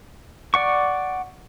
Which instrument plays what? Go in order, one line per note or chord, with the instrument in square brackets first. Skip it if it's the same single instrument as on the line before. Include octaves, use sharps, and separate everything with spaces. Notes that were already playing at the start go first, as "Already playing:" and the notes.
[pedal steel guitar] D5 F#5 C#6